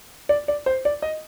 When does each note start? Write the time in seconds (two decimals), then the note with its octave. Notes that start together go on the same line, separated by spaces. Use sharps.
0.29 D5
0.48 D5
0.66 C5
0.85 D5
1.02 D#5